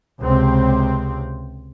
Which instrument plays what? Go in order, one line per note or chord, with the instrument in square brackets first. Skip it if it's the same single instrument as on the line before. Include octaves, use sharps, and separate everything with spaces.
[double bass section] C#2 C3 C4